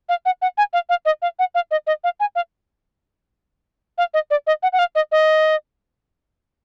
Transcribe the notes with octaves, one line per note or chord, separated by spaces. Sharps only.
F5
F#5
F#5
G#5
F5
F5
D#5
F5
F#5
F5
D#5
D#5
F5
G#5
F5
F5
D#5
D5
D#5
F#5
F#5
F5
D#5
D#5